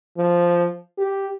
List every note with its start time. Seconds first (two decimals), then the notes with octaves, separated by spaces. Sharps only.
0.18 F3
0.98 G4